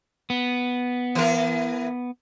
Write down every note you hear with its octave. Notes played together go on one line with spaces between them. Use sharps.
B3
E3 A#4